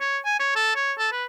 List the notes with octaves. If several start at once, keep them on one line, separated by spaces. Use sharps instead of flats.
C#5
G#5
C#5
A4
C#5
A4
B4